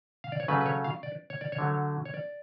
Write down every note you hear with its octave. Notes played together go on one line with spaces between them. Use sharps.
F5
D5
C#5
C#3 F#3 A3 B4
B4
C#5
F5
D5
C#5
D5
C#5
D3 F#3 A3
C#5
D5